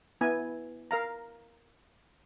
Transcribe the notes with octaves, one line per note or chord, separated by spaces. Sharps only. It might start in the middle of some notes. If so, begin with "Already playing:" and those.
B3 E4 G#5
A#4 F5 A#5